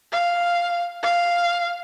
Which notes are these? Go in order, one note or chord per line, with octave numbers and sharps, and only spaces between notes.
F5
F5